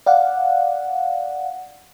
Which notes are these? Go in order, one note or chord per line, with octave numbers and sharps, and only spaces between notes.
D5 F5 F#5